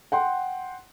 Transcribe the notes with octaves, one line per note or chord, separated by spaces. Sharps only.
F#5 G5 C6